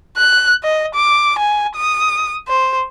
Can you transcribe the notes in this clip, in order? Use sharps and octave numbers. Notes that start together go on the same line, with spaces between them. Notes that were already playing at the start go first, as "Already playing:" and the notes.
F#6
D#5
D6
G#5
D#6
C5